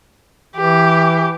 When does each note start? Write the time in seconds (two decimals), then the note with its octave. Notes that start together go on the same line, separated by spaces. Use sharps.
0.56 E3 G4